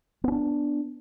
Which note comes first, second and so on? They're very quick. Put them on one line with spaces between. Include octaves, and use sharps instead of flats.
B3 C#4 D4